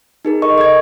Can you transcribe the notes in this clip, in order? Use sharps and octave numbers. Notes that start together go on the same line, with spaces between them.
D#4 G#4 A#4
A4 D#5 C#6
D#5 G#6